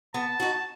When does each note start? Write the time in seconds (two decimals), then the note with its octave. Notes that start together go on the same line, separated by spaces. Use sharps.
0.14 B3 A5
0.40 D#4 F#4